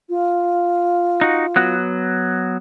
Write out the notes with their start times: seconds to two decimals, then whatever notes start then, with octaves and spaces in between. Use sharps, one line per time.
0.09 F4
1.21 D#4 F#4
1.56 F#3 B3 F#4